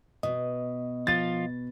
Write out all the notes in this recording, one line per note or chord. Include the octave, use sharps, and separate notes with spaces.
B2 D#5
F3 F4 A6